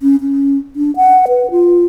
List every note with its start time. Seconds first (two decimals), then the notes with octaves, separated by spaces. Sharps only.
0.01 C#4
0.21 C#4
0.76 D4
0.96 F#5
1.28 B4
1.51 F4